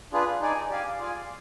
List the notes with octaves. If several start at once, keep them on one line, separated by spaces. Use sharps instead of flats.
D4 F4 G#4 B4
D#4 G#4 D5 G#5
G4 D5 F5 G#5
F4 G#4 D5 F5 G#5